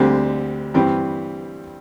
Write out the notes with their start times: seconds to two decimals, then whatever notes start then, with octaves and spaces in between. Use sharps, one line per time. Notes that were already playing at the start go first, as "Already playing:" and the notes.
Already playing: D2 D3 G3 C4
0.74 G2 E3 G3 C4